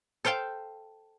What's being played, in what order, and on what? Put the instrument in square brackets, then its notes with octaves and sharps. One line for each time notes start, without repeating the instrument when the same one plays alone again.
[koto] A4 C5 F5 G5 A5